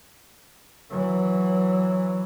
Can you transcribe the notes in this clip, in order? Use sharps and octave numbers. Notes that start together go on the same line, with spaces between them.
E3 F#3